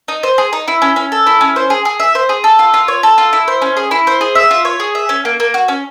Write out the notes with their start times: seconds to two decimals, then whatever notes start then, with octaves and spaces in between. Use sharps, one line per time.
0.08 D#4
0.23 C5
0.38 G#4
0.53 D#4
0.68 E4
0.82 C#4
0.96 C#4
1.12 A4
1.27 E4
1.41 C#4
1.56 C5
1.70 G#4
1.85 G#4
2.00 E5
2.15 C5
2.29 G#4
2.44 A4
2.59 F4
2.74 F4
2.88 C#5
3.03 A4
3.18 F4
3.33 E4
3.48 C5
3.62 C#4
3.77 G#4
3.91 E4
4.07 C5
4.21 G#4
4.35 E5
4.51 F4
4.65 C#5
4.80 G#4
4.95 E5
5.09 C#4
5.25 A#3
5.40 A#3
5.54 F#4
5.68 C#4